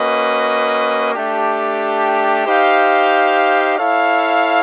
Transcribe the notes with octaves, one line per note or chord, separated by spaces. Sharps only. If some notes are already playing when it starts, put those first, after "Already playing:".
Already playing: A#3 C#4 F#4 B4 D#5
A3 D4 G4
D#4 G4 C5 F5
E4 A4 C#5 F5